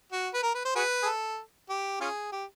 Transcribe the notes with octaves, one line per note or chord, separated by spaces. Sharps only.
F#4
B4
A#4
B4
C5
F#4 G#4 B4
G#4
A4
G4
C#4 F4 G#4
G4